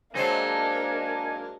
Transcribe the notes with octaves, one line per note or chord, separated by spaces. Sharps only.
F#3 G#3 A#3 D4 D#4 A4 C5 G#5